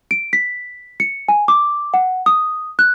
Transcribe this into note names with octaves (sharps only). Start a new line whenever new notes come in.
D7
B6
C#7
G#5
D6
F#5
D#6
F#6